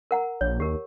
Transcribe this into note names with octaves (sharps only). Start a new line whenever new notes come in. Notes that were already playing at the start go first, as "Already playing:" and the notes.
A#4 F#5 A#5
A#1 C#5
D#2 G4 A#4